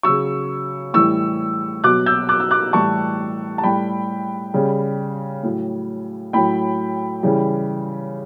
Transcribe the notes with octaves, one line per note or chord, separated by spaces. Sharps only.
C#3 F#3 C#6 E6
A2 E3 G3 C#6 E6
B2 F#3 D6 F#6
E6 G6
D6 F#6
E6
D6 F#6
A2 E3 G3 A5 C#6
A5
A2 G3 G5 B5
C#3 G3
A2 F#3
A2 F#3 G5 B5
C#3 E3 G3